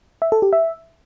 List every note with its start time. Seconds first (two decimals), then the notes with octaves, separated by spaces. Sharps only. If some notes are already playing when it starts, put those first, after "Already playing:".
0.22 E5
0.32 A4
0.42 G4
0.53 E5